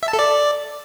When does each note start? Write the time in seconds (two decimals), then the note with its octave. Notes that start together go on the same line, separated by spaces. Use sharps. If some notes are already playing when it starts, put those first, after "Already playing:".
0.03 E5
0.08 A5
0.13 A4
0.19 D5